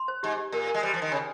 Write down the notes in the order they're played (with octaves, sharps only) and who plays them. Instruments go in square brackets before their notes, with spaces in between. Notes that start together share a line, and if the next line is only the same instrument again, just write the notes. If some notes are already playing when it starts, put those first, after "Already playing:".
Already playing: [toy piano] C6
C5
[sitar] G#2 [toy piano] G4
[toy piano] G4
[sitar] A#2 [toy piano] A#4
[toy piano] A#4
[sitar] G#3
[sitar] G3 [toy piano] C5
[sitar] F3
[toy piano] C5
[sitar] D#3
[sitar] C#3 [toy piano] G#5